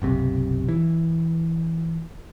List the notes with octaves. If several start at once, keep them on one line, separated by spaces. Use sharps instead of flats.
F#1 B1 C3
E3